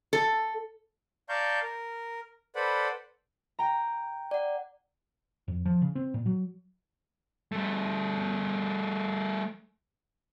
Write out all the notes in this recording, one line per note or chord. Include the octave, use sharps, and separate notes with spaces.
A4
D5 F5 A5 A#5 C#6 G6
A#4
A4 B4 C5 D5 F#5 B5
G5 A#5
D5 F#5
F2
F3
C#3
C4
A#2
F#3
G3 A3